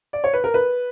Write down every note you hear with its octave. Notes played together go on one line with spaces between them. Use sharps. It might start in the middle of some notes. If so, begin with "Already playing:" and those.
D5
C#5
B4
A#4
B4